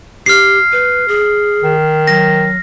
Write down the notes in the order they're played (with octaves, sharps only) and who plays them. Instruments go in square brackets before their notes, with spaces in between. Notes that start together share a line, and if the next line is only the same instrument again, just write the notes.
[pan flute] G4 [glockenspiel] F6 C7
[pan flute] B4
G#4
[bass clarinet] D#3
[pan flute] F#3 [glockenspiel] A#6